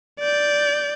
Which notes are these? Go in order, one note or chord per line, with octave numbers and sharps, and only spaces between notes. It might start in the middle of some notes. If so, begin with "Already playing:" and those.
D5 G6